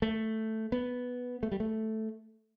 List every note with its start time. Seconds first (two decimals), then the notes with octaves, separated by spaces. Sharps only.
0.02 A3
0.72 B3
1.43 A3
1.52 G3
1.60 A3